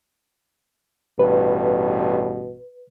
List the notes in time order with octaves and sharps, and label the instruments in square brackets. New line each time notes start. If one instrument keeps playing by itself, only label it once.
[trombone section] A1 G2 B2 [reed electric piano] B4